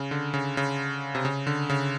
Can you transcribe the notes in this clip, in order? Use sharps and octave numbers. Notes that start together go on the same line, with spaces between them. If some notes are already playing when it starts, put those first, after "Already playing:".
Already playing: C#3
D3
C#3
C#3
C3
C#3
D3
C#3